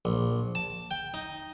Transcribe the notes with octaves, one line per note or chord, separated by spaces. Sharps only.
A#1
A5
G5
D#4